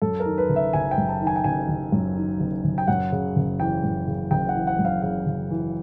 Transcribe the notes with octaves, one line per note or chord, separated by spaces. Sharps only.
F#2 A4
A#4
D#3
B4
F#1
E5
F#1 G#5
G5
F#2
A5
D#3
G#5
G5
F#1 G#5
F#1
F#2
D#3
F#1
F#1
G5
F#2 F#5
C#3
F#1
E3 G5
F#2
C#3
F#1 G5
F#5
E3
F#5
F#2
F5
C#3 F5
F#1
E3